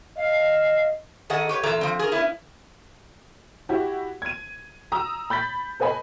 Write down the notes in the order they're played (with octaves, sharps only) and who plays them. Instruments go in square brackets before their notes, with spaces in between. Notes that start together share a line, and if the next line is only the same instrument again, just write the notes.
[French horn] D#5 [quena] F5
[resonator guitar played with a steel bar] D#3 G#4 A4 D#5 F#5
G4 B4 C#5
E2 A#2 E3 A4 A#5
F3 C4
G#4 A#4
B3 C#4 E4
[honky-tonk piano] E4 F#4 G4
G#6 D#7
A#5 D#6 E6
B5 G6 A6 B6
A4 B4 D#5 G#5 B5